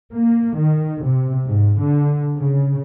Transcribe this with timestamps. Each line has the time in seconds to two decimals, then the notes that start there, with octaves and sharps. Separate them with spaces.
0.14 A#3
0.58 D#3
1.04 C3
1.46 G#2
1.82 D3
2.37 C#3